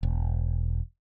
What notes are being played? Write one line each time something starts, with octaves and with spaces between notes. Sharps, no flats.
E1